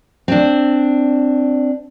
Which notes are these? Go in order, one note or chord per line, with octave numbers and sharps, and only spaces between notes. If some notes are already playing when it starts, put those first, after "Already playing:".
C4 D4